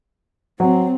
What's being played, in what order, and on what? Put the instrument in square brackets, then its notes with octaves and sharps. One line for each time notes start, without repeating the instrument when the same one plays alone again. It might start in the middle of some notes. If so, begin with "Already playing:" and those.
[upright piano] F#3 [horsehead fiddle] C4